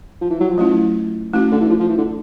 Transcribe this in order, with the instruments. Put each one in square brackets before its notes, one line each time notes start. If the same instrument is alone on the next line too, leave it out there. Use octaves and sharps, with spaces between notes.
[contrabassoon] F3
E3
F#3
F3
[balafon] F#3 A3 C#4 E4
[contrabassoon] E3 [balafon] A3 C#4 F#4
[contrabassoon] D3
E3
F3
F3
E3
D3